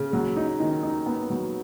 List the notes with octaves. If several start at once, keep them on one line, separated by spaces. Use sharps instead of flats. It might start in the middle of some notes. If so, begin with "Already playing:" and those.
Already playing: C#3
F#3
D#4
D#3
D#4
B3
F#3